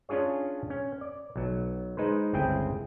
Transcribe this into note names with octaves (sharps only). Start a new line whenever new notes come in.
C#4 D4 F4 G#4 C#5
C#4
D5
B1 F#3
G#3 D#4 B4 C5
G1 C#2 C4 E4 G#4 G5